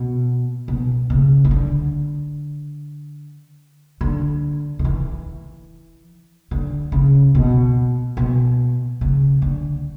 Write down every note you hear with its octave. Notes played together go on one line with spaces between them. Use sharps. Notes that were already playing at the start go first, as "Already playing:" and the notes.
Already playing: B2
B2
C#3
E3
D3
D3
D3
E3
D3
C#3
B2
B2
C#3
D3